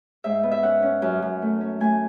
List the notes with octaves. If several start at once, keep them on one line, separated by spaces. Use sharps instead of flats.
G#2 E5
B3
E5
C#4 F#5
C#4
F#2
F#2
A3
C#4
A3 G#5